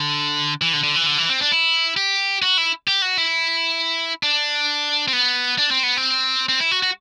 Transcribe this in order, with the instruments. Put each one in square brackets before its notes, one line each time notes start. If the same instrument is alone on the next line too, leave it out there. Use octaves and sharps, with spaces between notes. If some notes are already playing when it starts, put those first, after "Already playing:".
Already playing: [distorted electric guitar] D3
E3
D3
D3
E3
D3
E3
C4
D4
E4
G4
F#4
E4
G4
F#4
E4
D4
C4
B3
D4
C4
B3
C4
C4
E4
F#4
F#4